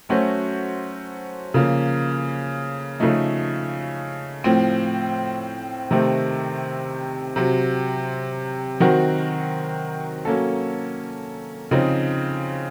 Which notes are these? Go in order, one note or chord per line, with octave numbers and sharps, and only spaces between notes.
F#3 A3 C#4 F#4 C5
C#3 F3 A#3
C#3 F3 A3 D#4
A2 F3 C4
C3 D#3 A3 C4
C3 F#3 C4
D#3 F#3 C4 F#4 A#4
F#3 A#3 C#4 A4
C#3 F3 C4 D#4